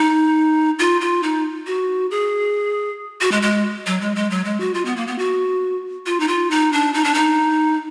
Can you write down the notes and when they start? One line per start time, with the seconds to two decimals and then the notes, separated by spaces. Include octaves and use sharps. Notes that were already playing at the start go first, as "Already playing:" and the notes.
Already playing: D#4
0.79 F4
1.01 F4
1.23 D#4
1.67 F#4
2.11 G#4
3.21 F#4
3.32 G#3
3.42 G#3
3.86 F#3
4.01 G#3
4.16 G#3
4.30 F#3
4.45 G#3
4.60 F#4
4.74 F4
4.85 B3
4.97 A#3
5.07 B3
5.18 F#4
6.06 F4
6.20 D#4
6.28 F4
6.51 D#4
6.73 D4
6.94 D#4
7.04 D4
7.14 D#4